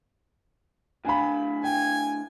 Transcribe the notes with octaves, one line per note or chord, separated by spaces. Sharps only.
A2 D4 F5 G#5 B5
G5 G#5